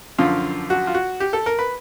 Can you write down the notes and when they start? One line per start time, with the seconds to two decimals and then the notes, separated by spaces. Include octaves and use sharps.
0.18 F#2 D3 F3 F4
0.70 F#4
0.87 F4
0.94 F#4
1.20 G4
1.33 A4
1.46 A#4
1.59 B4